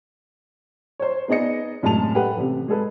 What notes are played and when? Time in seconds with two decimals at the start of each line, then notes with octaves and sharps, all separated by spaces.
1.00 C5 C#5
1.28 B3 D#4 G#4 D5 D#5 C#7
1.83 F#2 A2 C3 G#3 A5 F7
2.15 G4 A4 B4 F#5
2.37 A1 C3
2.68 G#3 G#4 A4 B4